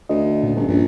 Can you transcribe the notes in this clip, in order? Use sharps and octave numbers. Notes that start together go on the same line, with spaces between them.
D2 D#5
A#2 C#4
G1
A#1 G2